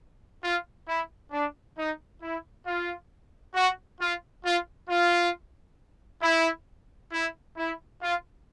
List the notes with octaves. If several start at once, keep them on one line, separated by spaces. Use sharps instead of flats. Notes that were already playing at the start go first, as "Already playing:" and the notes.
F4
E4
D4
D#4
E4
F4
F#4
F4
F4
F4
E4
E4
E4
F4